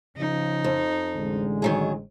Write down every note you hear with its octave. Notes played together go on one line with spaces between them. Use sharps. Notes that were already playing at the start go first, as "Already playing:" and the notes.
C#3 F3 D#4
F2
A1 D3 G#3
D#3 F#3 G#4